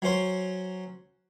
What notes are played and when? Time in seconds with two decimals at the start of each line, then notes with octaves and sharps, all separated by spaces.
0.02 F#3 C#4 C5 C6